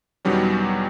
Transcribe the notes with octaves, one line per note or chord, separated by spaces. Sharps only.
E2 B2 D#3 F#3 G3 C#4